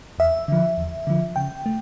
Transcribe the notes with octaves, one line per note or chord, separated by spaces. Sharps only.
E2 E5
D3 F3
E2
D3 F3
C#3 G5
A3